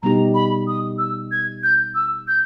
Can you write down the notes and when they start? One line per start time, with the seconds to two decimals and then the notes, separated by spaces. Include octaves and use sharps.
0.03 B2 G3 B3 D#4 G4 A#5
0.34 B5
0.67 D#6
0.98 E6
1.31 G#6
1.63 G6
1.95 E6
2.28 G6